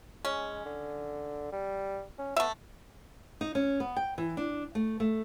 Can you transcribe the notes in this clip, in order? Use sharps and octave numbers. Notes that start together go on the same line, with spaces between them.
G#3 C#4
D3
G3
C#4
A3 B3 E5
D#4
C#4
B3
G5
E3
D4
A3
A3